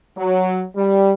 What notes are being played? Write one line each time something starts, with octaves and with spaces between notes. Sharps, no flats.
F#3
G3